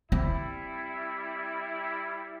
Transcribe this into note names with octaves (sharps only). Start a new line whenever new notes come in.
G3 C4 E4